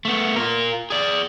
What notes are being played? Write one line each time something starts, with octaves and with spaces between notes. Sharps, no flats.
A3 B3
F4 A#4
G#4 D5